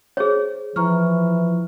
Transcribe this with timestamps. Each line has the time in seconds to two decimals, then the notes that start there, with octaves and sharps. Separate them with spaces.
0.17 G#4 C5 C#5
0.76 E3 F3 A#5 C#6 F6